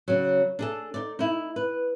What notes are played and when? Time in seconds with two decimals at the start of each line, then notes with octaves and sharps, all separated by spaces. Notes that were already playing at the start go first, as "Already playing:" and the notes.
0.08 C#3 F#3
0.59 D4 G#4 A4
0.94 D#4 D5
1.19 D#4 E4
1.56 B4